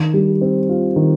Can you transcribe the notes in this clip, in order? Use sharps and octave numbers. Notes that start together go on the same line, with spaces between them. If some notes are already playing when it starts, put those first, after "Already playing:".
Already playing: D#3
G3
C4
F4
D#3